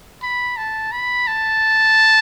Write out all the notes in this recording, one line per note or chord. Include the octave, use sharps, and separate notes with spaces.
B5
A5
B5
A5